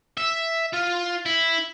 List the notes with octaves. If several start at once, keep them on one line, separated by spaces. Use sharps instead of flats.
E5
F4
E4